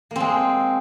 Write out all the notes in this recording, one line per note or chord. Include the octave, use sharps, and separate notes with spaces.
G#3 A#3 C4